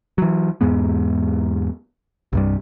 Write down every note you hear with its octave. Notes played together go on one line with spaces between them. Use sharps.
E3 F#3
E2 G#2 G#3 B3
C2 G2 G3